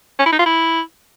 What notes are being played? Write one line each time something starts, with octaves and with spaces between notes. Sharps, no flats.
C#4
E4
D#4
F4
E4